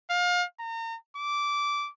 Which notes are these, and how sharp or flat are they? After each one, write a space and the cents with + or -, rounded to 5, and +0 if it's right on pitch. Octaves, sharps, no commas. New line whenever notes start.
F5 +30
A#5 -35
D6 -15